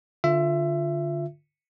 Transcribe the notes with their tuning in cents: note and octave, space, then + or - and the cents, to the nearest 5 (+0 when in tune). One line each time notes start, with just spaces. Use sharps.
D3 +0 F4 +0 E5 +20